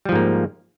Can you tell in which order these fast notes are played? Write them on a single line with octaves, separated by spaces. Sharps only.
G3 F3 G#2 A#3